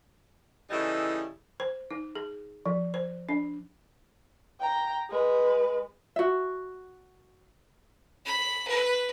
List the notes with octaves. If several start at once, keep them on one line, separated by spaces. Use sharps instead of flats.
C#3 E3 G3 D#4 E4 A4
C5
D#4
G#4
F3
C5
D4
G5 A#5
G#3 B4
F#4 E5
B5
B4